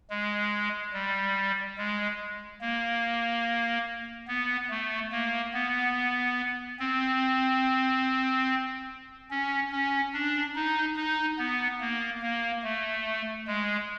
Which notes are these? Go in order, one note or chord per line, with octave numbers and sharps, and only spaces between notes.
G#3
G3
G#3
A#3
B3
A3
A#3
B3
C4
C#4
C#4
D4
D#4
D#4
B3
A#3
A#3
A3
G#3